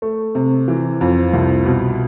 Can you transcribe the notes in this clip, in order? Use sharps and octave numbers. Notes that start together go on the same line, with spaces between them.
A3
C3
E3
F2
C2
B2